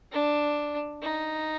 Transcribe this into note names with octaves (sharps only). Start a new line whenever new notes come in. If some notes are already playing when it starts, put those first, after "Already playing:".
D4
D#4